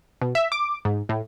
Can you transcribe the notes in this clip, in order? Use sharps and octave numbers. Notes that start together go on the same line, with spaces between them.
B2
E5
D6
G#2
A2